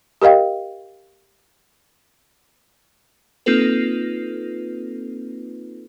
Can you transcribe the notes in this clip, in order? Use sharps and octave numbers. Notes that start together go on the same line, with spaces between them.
G4 A#4 D#5 F5 G5
A#3 C4 D#4 F4 A4 B4